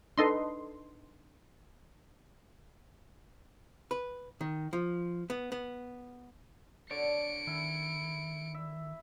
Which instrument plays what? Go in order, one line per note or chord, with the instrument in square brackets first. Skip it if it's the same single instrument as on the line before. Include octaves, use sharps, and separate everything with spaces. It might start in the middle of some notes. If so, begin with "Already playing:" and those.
[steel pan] D4 D#4 B4 [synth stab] A4 D#5 C6
[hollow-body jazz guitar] B4
D#3
F3
B3
B3
[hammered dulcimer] D3 [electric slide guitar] C#5 D5 [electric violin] C#7 D7
[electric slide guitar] D#3 [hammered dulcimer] E4
[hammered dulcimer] E5